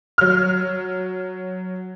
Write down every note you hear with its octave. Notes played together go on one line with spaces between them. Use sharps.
F#3 F6